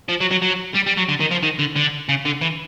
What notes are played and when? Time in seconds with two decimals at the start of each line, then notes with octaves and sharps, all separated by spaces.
0.08 F3
0.20 F#3
0.31 F#3
0.42 F#3
0.75 G3
0.87 G3
0.97 F#3
1.09 D3
1.20 D#3
1.31 F3
1.43 D#3
1.59 D3
1.76 D3
2.09 C#3
2.25 D3
2.41 E3